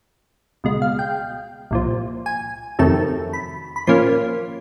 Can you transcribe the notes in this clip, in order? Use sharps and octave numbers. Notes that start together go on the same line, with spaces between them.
C#2 B2 G#3
F5
G5
C2 A#2 F3
G#5
F2 C3 D#3 F#3 A3 A5
B5
B5
A#2 F3 A#3 C#4 C6